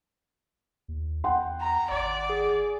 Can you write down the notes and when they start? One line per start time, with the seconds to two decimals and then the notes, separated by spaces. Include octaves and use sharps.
0.88 D#2
1.24 E2 F#5 G5 C6
1.61 A#5
1.91 G#1 D5
2.29 G#4